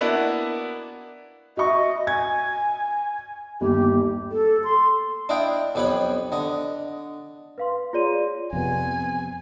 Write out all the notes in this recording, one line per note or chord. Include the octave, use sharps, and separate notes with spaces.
A#3 B3 D4 E4 F#4
F#4 D#5 E5 C#6
G#5 G#6
G1 D#2 G4
A4
C6
D4 E4 D#5 F5 G5
B1 F2 G4 B4 C#5 B5
D3 D#5
B4 F5 C6
F4 G#4 C#5 D5 C6 D#7
F2 C3 B3 G#5